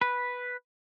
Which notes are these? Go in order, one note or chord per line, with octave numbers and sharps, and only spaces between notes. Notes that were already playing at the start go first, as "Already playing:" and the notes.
B4